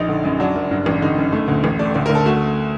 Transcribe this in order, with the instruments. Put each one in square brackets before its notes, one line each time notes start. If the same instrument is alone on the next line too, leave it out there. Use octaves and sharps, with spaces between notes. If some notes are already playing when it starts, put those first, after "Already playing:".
Already playing: [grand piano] A#1 D#4
D3
F#2
F#3 D4
F#1
G2
A1
D3 D#4
F#2
A3
D2
A1
A3 D5
D2 D5
A#4
D2
A4
A3 F#4